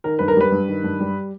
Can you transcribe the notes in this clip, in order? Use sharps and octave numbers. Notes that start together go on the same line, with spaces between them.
D#3 A#4
G2 B4
A#4
G3 B4
G2
D#3
G2
G3